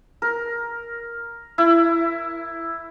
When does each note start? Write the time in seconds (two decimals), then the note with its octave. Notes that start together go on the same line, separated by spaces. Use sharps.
0.22 A#4
1.58 E4